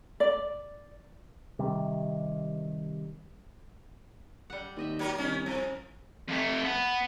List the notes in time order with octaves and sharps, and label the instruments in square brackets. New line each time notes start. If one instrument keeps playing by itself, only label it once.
[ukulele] D5
[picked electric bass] C3 D#3 G3
[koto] G3 F#5
[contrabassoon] D#2 [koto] C4 D#5 E5
[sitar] F#3 A#4
[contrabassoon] C2 [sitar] D#3 C#4
[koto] C#3 G#4 A#4 [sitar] F3
[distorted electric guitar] F2 A3
B3